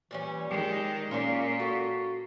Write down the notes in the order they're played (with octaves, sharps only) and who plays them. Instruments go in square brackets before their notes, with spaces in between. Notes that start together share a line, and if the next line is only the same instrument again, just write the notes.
[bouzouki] A#2 G3 C#4 [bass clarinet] E3
[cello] D#3 G#3 [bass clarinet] G4
[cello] A#2 [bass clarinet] C#4 [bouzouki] F4 C#5 D5
[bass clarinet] F#4 [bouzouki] A4